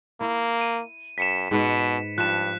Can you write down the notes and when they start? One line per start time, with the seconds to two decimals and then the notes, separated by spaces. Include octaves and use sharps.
0.21 A#3 E4
0.61 D#7
1.18 F#2 B6 C#7 E7
1.51 G#2 B2 B4
2.18 G2 F3 F#6 E7